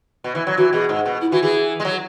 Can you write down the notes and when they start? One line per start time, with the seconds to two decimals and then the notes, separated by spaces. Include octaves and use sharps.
0.24 B2
0.35 E3
0.47 F#3
0.57 E3 F#4
0.73 B2 G#4
0.89 G#2
1.06 B2
1.21 E4
1.32 E3 F#4
1.42 E3 G#4
1.80 G#3
1.85 F#3